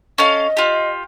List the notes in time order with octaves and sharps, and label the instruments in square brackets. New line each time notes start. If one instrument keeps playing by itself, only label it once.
[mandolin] C#4 A4 F5 [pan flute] D#5
[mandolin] F4 G4